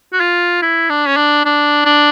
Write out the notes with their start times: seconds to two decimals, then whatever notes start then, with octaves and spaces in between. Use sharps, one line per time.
0.13 F#4
0.20 F4
0.62 E4
0.90 D4
1.07 C#4
1.16 D4
1.45 D4
1.85 D4